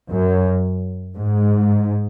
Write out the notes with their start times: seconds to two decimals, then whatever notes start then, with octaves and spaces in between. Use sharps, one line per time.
0.10 F#2
1.15 G#2